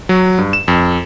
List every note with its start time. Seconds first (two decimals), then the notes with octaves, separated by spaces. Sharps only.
0.09 F#3
0.38 G2
0.53 E7
0.68 F2